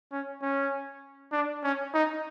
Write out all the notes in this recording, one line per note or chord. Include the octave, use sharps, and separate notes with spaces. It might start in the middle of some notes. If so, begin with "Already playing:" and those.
C#4
C#4
D4
C#4
D#4